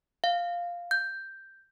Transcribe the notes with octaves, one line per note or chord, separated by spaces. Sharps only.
F5
G6